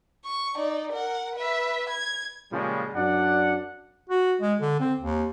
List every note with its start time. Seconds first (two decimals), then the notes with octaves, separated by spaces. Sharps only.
0.24 C#6
0.56 D#4 D5
0.92 A#4 F#5
1.35 B4 E5
1.89 G#6
2.52 A#2 C#3 F3 G3 G#3
2.95 F#2 D4 D5 F#5
4.10 F#4
4.41 G#3
4.60 D3
4.80 C4
5.00 D#2